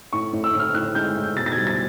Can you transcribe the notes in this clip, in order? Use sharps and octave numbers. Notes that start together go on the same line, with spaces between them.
A2 C#6
A2
E6
A2 F6
A2 F#6
G#3 G6
A2
B2 A6
A6
G#6
G3
A6